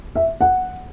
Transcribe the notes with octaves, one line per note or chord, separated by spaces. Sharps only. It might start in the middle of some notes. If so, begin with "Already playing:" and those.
E5
F#5